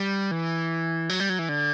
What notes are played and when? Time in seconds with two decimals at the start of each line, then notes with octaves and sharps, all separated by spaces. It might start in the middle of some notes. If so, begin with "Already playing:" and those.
Already playing: G3
0.31 E3
1.09 F#3
1.20 G3
1.29 F#3
1.39 E3
1.49 D3